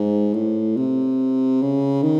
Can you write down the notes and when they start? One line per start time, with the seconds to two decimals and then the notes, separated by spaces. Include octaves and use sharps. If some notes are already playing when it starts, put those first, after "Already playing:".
Already playing: G#2
0.34 A2
0.77 C3
1.62 C#3
2.03 D#3